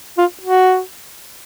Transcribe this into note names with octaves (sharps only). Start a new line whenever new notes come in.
F4
F#4